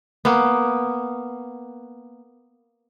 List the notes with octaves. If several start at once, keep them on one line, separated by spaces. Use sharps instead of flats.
A#3 B3